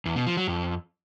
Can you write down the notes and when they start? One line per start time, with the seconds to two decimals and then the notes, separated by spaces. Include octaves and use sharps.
0.06 E2
0.16 B2
0.27 F3
0.37 F#3
0.48 F2